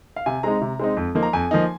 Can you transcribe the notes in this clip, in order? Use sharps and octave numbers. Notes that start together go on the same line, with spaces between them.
F5
C3 G#5
G#3 C4 D#4 A#5
C3
G#3 C4 D#4
F2
F3 A#3 D#4
A#5
F2 G#5
F3 A#3 D#4